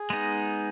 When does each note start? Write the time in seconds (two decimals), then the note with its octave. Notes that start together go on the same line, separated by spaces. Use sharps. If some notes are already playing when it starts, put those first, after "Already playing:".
Already playing: G#4
0.10 G#3 B3 D#4